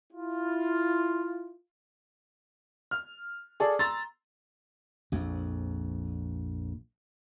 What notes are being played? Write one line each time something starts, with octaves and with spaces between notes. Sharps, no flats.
E4 F4
F6
G#4 A4 D5
A#5 C6 E6 A6
A#1 F2